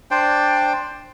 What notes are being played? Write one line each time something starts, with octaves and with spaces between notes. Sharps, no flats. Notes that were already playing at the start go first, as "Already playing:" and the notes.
D4 C5 D5 G5